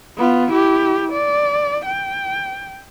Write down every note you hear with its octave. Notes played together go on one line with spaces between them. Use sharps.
B3 F4
E4 G4
D5
G5